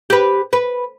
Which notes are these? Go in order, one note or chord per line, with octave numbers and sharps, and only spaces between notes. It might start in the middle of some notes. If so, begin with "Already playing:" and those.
G4 B4
B4